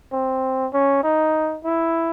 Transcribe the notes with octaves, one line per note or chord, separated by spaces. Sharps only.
C4
C#4
D#4
E4